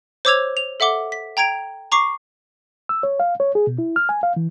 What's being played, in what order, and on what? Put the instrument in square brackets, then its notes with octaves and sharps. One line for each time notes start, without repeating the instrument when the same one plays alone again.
[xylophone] C5 C#5 D6 E6 G#6 F7
F7
A4 E5 F#5 D6 G7
B6
G5 A#5 G#6 D7 F7
A#5 C#6 D6 C7
[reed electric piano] E6
C#5
F5
C#5
G#4
B2
E4
F6
G#5
F5
E3